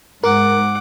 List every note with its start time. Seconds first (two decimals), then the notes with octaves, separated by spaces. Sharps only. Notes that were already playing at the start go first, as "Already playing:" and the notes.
0.24 G#2 A#4 F#5 D6